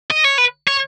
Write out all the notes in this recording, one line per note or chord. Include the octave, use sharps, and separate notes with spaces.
D#5
C#5
B4
C#5